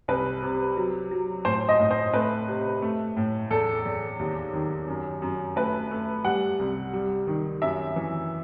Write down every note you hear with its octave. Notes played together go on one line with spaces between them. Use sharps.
C2 B4
C3
F#3
F#3
A2 C5
D#5
A2
C5
A3 B4
C3
A3
A2
E2 A4
E2
D#2
D#3
F#2
F#2
A3 B4
A3
G3 F#5
C2
G3
D#3
F#2 E5
E3